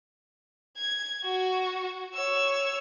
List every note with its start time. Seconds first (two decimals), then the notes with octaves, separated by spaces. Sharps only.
0.77 G#6
1.25 F#4
2.14 C#5 E6